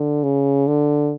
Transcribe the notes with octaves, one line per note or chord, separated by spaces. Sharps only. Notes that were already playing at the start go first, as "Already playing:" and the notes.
Already playing: D3
C#3
D3